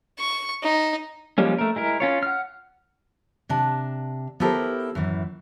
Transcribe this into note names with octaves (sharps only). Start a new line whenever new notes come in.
C#6
D#4
F3 G3 G#3 A#3 C#4
A3 A#4
G#3 E4 A#4
C#4 F4 C#5
F#5 F6
C3 D4 A5
B3 E4 G4 A4 A#4 C5
F#2 A2 E3